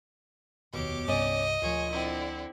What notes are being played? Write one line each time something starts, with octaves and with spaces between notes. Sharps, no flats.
F1 D#2 B2 G4 C#5 D6
C2 G2 C#4 D5 D#5
D2 A#2 F3 G#4 C#5
D3 C4 E4